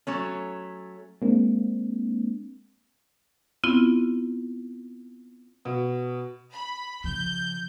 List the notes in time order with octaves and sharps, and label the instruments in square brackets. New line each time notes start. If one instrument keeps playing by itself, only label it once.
[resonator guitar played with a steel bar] F#3 A3 C#4
[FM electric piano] G#3 A#3 C4 D4
[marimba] B3 C4 E4 F4
[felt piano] B2
[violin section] B5
[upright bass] C#3 F3 [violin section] G6